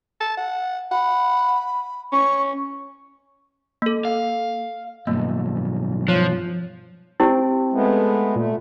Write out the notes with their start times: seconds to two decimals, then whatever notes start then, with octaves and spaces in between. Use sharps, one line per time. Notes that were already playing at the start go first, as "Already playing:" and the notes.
0.21 A5
0.38 F#5
0.92 F#5 B5
2.13 C#4 C#6
3.82 A#3 A4
4.05 F5
5.07 B1 G2 A#3
6.08 F3 C#5
7.20 C4 E4 G4
7.73 G#3 A3 B3
8.36 A#2 A3